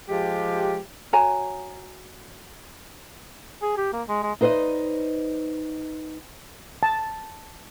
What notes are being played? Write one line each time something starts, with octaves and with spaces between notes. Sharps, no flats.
F3 G#3 G4
F#4 C#5 G#5 A#5
G#4
G4
A#3
G#3
G#3
D#4 B4 C5 D5 D#5
A5